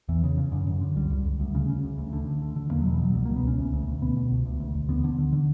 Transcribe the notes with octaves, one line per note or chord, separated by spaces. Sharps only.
E2 E3
C#3
C#3
F#2 D3
F#2
D3
C#2 G3
C#2
C#2
D2
C#3
C#3
D2
D2
D3
D2
D3
D3
E2 A#3
F#3
B2
E3
B2 F#3
C#2 G3
A#3
B2
B3
C#2 C#4
D2
D2
D2
B2 B3
B2
C#2
D2
D2
D2
D3 B3
D3
D3
D3